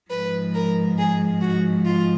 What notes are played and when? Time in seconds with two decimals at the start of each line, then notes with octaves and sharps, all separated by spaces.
0.10 G#2 F3 B4
0.54 A#4
0.98 G#4
1.41 F#4
1.85 F4